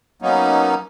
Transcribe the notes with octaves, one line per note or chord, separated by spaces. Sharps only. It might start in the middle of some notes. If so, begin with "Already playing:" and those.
F#3 A#3 B3 C#4 D#4